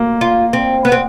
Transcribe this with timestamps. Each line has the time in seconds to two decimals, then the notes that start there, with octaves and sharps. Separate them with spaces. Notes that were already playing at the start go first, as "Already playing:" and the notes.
Already playing: A#3
0.21 F4
0.53 C4
0.85 B3
0.92 C4